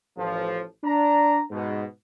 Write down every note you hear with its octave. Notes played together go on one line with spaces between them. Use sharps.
A1 F3
D4 A#5
G#2 B2